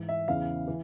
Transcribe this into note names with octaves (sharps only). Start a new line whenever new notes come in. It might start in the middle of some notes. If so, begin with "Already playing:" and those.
Already playing: G#2 E3
E5
E2 C#3 E3 F5
E3